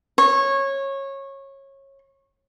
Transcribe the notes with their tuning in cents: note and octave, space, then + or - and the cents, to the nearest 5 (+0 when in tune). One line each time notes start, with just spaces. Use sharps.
C#5 -20